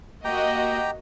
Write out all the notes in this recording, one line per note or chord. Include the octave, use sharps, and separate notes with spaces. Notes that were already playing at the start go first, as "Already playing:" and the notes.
A#3 F#4 G4 D#5 G5 A#5